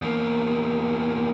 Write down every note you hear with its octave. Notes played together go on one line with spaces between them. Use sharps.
E2 A#3